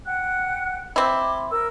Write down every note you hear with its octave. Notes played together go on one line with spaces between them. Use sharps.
F#5 G5 F#6
C4 E4 C6 D6
A#4 E6